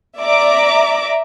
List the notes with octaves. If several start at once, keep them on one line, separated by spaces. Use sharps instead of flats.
D5 E5 A#5 D6